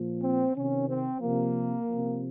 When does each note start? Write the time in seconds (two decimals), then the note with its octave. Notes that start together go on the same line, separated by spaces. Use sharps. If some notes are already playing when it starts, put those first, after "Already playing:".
Already playing: A#2 F3
0.22 C4
0.55 C3 D#3 C#4
0.88 C4
1.21 C3 F3 A#3
1.87 C3 F3